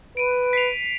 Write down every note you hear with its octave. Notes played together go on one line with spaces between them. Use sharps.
B4 D7 D#7
B6 C7 F7